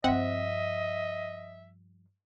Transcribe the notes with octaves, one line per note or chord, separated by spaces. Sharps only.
G2 F3 C4 D#5 E5 F#5